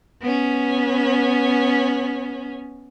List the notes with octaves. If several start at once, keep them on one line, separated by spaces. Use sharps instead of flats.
B3 C#4